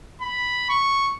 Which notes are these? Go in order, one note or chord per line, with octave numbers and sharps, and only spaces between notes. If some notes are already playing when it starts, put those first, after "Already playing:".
B5
C#6